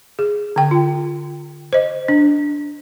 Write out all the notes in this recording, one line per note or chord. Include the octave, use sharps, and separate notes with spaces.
G#4
D3 G5
F4
C5 D#5
D4